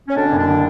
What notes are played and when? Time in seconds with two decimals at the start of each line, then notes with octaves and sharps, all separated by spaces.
0.08 C#4
0.15 B2 D3 D4
0.28 F#1 C#4
0.39 D3 D4